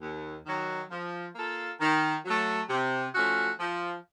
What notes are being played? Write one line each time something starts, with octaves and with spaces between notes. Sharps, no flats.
D#2
D#3 F#3
F3
A#3 F4 A4
D#3
F#3 A3
C3
F3 A3 C#4 F#4
F3